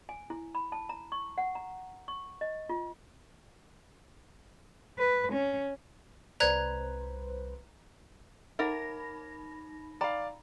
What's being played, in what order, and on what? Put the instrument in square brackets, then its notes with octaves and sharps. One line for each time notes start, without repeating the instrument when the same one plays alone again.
[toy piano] G#5
E4
B5
A5
A#5
C#6
F#5
A#5
C#6
D#5
F4
[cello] B4
C#4
[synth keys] C2 B4 C5 [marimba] D5 [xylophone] A#5 F#6 G#6
[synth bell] D#4 B5 A#6 [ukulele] A#4 [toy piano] E5 F#5
[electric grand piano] D5 F5 [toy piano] G5 A#5 B5